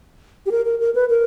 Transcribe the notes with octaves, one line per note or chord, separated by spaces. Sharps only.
G4
A#4
A#4
A#4
B4
A#4